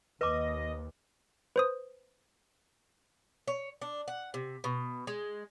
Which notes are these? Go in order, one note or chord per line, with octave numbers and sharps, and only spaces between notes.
D#2 B4 D#5 D6
B4 C5 D#6
C#5
D4
F#5
C3
B2
G#3